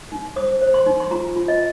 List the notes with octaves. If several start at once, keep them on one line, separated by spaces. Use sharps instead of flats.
D#4
C5 D#6
C5
C6
D#4
C6
F4 A#5
F4
D#5